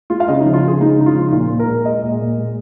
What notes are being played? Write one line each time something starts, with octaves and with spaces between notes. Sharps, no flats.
G#3 F4
F5
C#3 D#5
D#4
F3
F4
C#3 G#4
G#3 D#4
C#3 D#4
F4
F3
D#4
A#2 F4
A#2
A#4
G#3
G#3 D#5
A#2
A#2
G#3